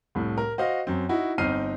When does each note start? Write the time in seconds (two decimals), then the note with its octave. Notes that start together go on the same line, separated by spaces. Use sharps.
0.15 C2 A2
0.38 A#4
0.58 F#4 C5 D#5 F5
0.87 F#2 C4
1.09 D#4 E4 F#4
1.38 G1 C4 D#4 F6 C7 D#7